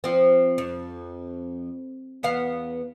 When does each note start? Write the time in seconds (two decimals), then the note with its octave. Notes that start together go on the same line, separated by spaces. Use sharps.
0.04 F3 C4
0.58 F2
2.23 E2 B3 F5